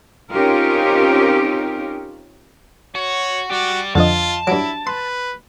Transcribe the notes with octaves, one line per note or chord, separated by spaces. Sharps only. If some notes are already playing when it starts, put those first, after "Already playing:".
C4 C#4 D#4 F4 G4 A#4
F#4 C#5
F#4 G4 D5
F2 D3 F3 F4 D#5 A5
G2 F#3 E4 D7
B4 C6